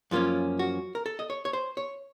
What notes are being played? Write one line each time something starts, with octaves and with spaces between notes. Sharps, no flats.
F#2 F3 A#3 C#4 F4
F#4
A#4
A4
D#5
C#5
C#5
C5
C#5